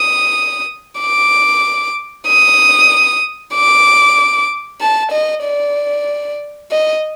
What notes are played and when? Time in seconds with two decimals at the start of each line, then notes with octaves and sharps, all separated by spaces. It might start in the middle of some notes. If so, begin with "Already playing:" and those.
Already playing: D#6
1.00 D6
2.27 D#6
3.54 D6
4.81 A5
5.12 D#5
5.44 D5
6.70 D#5